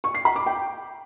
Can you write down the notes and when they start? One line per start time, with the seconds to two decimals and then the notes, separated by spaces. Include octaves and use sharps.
0.04 C#6
0.15 C7
0.25 B5
0.36 D6
0.46 G5